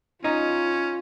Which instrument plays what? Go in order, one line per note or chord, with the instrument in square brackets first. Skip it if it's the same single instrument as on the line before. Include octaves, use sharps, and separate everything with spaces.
[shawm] C#4 [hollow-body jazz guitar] D#4 [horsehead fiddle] F4